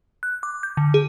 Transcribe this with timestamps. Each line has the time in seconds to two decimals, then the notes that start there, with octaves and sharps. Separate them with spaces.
0.23 F#6
0.43 D6
0.63 G6
0.77 D3
0.94 G#4